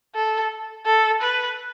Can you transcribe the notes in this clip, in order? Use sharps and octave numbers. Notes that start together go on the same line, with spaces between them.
A4
A4
B4